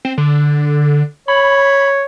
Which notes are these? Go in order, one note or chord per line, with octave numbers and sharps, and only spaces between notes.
C4
D3
C#5 B5